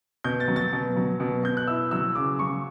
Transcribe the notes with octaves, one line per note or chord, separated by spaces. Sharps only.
B2 G6
A6
F#3
A6
B2
F#3
B2
B2 G6
F#6
E4 E6
F#3 E6
C#3 D6
F#3 C#6